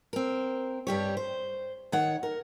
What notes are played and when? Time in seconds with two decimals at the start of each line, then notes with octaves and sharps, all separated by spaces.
0.13 C4 A#4
0.87 G2 G3 G4 C#5
1.17 C5
1.92 D#3 C#5 F#5
2.23 A#4